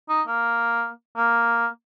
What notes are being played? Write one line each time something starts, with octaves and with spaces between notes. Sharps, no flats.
D#4
A#3
A#3